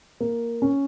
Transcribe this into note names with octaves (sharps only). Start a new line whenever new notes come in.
A#3
C#4